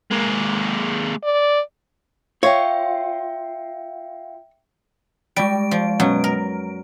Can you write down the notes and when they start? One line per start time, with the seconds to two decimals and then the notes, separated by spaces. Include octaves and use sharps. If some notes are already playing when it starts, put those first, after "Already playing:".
0.11 G#3 A#3
1.24 D5
2.43 F4 C#5 E5 G5
5.36 G3 G#3 D7
5.71 F3
6.00 F#2 B2 F#3
6.24 A#4